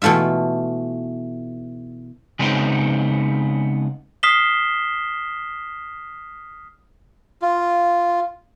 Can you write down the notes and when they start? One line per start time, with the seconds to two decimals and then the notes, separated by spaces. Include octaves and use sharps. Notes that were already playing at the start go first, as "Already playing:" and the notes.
0.02 B2 E3 A3 F4 E5
2.39 C#3 G3 G#3 B3 C4 D#4
4.23 D#6 F6 B6 C7 E7 G7
7.42 F4